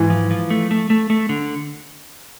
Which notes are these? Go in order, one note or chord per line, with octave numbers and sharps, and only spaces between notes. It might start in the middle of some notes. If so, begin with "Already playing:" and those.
Already playing: G#2 E3
F3
F3
A3
A3
A3
A3
D3